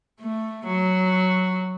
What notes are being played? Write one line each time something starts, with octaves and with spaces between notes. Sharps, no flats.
A3
F#3